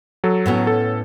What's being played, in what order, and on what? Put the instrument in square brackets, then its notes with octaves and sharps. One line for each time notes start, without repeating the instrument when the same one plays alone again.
[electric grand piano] F#3 A4
[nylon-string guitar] A2 B3 C#4
[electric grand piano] A4